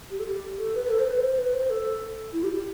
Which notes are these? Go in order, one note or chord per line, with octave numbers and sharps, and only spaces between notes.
G4
A4
G4
A4
B4
B4
A4
C5
B4
C5
B4
C5
A4
E4
G4
G4